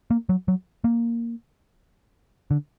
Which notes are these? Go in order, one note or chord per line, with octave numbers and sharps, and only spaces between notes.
A#3
F#3
F#3
A#3
D3